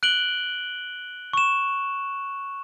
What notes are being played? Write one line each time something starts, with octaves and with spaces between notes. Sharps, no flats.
F#6 D7 F#7 G7
C#6 E7